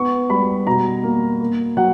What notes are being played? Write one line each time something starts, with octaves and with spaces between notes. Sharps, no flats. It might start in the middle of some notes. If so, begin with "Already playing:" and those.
Already playing: B3 C#6
G3 B5
B2 A#5
A#3
A#3
F#3 F#5